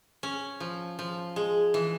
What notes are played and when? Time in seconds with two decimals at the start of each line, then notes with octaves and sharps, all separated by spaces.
0.23 C#4
0.60 F3
0.99 F3
1.36 G#3
1.74 E3